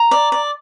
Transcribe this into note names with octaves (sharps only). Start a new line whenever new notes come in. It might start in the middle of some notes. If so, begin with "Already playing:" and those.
Already playing: A#5
D5
D5